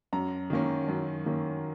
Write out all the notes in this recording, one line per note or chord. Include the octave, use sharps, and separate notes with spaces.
F#2 A#5
D#3 A#3 C#4
F#2
D#3 A#3 C#4